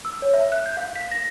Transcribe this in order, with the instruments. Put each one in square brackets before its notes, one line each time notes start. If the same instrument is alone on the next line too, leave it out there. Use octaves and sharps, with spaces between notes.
[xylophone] E6
C#5
E5
F#6
G6
F5
B6
A#6